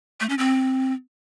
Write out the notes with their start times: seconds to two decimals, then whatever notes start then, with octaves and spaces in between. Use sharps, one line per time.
0.20 A3
0.29 C#4
0.38 C4